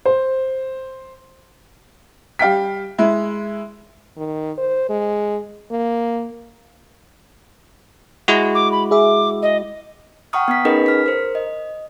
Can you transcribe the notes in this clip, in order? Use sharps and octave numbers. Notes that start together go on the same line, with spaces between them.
C5
G3 F5 G5 B6
G#3 E4
D#3
C5
G#3
A#3
G#3 E4 F#4
D6
B5
G#4 E5 D6
D#5
F#5 G5 A#5 C#6 D#6 F6
B3 B6
C#4 D#4 G#4 A#4 B4 D#5
F6 B6
A#4 C5
D#5